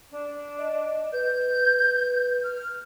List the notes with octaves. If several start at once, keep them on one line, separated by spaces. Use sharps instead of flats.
D4
D#5
B4 G6
F6